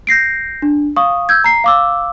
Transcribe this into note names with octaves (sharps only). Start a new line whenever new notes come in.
G6 A#6 C7 D7
D4
F5 C#6 D#6
E6 G6 G#6
A#5 C7
F5 D6 E6